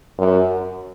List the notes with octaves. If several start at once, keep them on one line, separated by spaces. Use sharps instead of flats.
F#2